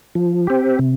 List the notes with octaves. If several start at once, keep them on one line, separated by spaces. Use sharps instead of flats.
F3
C4 G4
C3